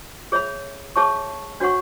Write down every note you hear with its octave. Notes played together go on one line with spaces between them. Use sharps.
G#4 C#5 E5 B5
G#4 C#5 E5 A5 C#6
D4 F#4 C#5 F#5 C#6